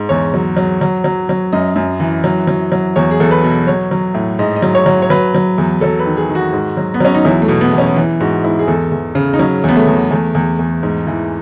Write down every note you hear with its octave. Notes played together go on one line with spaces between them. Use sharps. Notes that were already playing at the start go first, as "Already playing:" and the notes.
Already playing: G#2
E2 C#5
F#3
F#3
F#3
F#3
F#3
F#2 D#5
F#2
E3
F#3
F#3
F#3
E2 C#5
G#4
E2 A4
B4
B2
F#3 C#5
F#3
A2
G#2 D#5
D#5
F#3
C#5
F#3
C#5
F#3 B4
F#3
E2
F#3 A4
B4
D#3
G#4
D#3
F#4
G#2
F#3
B3
F#3 C#4
D#4
E2 E4
A3
B2
B3
E2
C#4
E3
G#2 F#4
G#2 E4
G#4
E2 A4
E2
C#3
D#4
F#3 C#4
E2 B3
A3
E2
E2 A3
E2
E2
G#2
E3